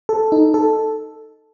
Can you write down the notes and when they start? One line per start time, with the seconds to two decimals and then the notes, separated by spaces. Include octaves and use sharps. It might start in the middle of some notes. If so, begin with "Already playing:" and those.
0.09 A4
0.32 D#4
0.54 A4